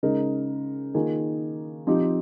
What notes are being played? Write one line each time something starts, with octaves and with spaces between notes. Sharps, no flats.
C#3 G#3 D#4 A#4
D#3 A#3 F4 G#4
F3 C4 D#4 G4